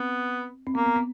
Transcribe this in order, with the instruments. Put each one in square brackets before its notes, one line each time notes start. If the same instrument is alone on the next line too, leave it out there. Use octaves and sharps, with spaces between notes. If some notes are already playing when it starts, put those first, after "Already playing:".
Already playing: [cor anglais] B3 [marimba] C4
[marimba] C4
[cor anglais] A#3 [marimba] B3
[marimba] B3
B3